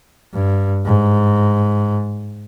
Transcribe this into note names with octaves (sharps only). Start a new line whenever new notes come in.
G2
G#2